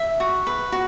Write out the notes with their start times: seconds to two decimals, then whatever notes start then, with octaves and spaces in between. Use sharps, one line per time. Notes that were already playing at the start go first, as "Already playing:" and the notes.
Already playing: E5
0.20 F#4
0.47 B4
0.72 F#4